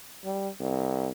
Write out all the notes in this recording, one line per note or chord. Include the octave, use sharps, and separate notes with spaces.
G3
C2